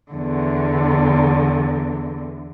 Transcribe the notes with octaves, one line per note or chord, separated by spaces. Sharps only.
E2 D3